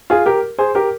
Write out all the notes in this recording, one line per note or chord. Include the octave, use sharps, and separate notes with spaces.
F4 G#4
G4 A#4
G#4 C5
G4 A#4